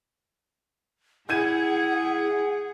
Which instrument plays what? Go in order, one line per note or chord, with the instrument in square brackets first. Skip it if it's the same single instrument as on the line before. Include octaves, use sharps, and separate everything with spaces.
[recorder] E4 [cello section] G#4 [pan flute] F#5 [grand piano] G6 G#6 D#7